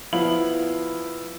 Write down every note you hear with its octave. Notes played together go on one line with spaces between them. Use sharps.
F3 B3 E4 F5 B5 F#7